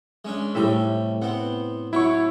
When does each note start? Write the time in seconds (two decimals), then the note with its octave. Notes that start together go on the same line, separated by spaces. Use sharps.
0.25 G#3 C#4 D4
0.55 A2 C3 G3 A3 G4 E5
1.22 B3 C4 F#5
1.93 F#3 E4 C#5 C#6